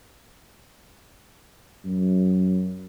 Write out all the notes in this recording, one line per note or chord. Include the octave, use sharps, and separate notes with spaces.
F#2